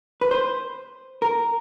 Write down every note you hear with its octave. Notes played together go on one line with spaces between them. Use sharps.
B4
C5
A#4